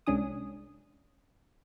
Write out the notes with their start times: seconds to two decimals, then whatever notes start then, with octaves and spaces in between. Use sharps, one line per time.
0.07 C2 G#3 C#4 D4 G#5 D#6